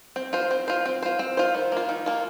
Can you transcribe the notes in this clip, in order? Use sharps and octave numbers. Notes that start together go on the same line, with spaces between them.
C4
F4 C5
C4
F4 C5
C4
F4 C5
C4
F4 C5
D#3
A#3 F4
D#3
A#3 F4